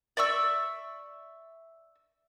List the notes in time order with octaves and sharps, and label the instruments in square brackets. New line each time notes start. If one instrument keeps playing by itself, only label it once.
[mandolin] D5 E5 C#6 E6